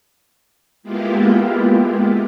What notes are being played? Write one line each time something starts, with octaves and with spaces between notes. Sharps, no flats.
G#3 A#3 B3 E4 F4 G4